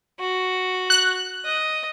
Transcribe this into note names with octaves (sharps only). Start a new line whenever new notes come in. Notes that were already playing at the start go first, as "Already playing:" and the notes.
F#4
F#6
D#5